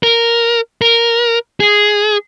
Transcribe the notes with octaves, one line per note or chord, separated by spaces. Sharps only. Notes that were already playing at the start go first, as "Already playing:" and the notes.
A#4
A#4
G#4